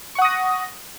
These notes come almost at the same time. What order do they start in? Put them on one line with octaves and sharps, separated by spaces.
C#6 F#5 D#6 A#6